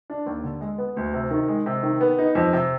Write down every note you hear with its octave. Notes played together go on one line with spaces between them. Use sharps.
D4
D#2
D3
G#3
B3
D2
C3
D#3
G#3
C3
D#3
B3
D#4
F2
C3